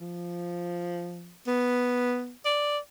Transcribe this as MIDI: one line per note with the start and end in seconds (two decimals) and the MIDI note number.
0.01 1.36 53
1.47 2.33 59
2.45 2.78 74